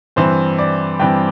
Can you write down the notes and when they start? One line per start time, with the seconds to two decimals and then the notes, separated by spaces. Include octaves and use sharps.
0.16 G2 E3 C4 C5
0.59 D5
1.00 G2 E3 C4 G5